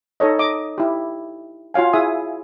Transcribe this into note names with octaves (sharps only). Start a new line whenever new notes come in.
D#4 A4 C#5 D#5
D#5 D6 D#6
E4 G4
F4 F#4 C#5 F5 G#5
E4 G#4 E5 G#5 D#6